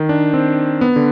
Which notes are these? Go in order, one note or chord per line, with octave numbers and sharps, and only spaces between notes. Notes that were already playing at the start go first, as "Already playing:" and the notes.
Already playing: D#3
D4
C4
B3
D3